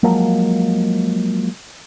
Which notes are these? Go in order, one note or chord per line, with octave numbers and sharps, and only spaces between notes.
F3 F#3 G#3 A#3